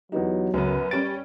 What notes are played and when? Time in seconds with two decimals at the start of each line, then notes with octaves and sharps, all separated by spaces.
0.12 E2 F#3 B3 D#4 G4
0.54 C#2 F#2 C#3 B3 B4
0.91 G3 C#4 G4 A6 D7